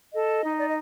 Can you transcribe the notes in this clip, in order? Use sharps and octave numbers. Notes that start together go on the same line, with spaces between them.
A4 D#5
D#4
D5
D#5